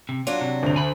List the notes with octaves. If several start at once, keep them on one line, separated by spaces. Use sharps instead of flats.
C3
F#3 D4 F4 F#4
C3
D2 F7
G#5 B5